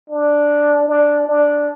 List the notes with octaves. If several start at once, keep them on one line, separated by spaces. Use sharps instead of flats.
D4
D4
D4